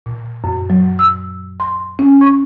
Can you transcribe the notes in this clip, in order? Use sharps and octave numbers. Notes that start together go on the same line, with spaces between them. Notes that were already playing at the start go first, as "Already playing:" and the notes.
A#2
F#2
F#3
E6
C6
C#4
C#6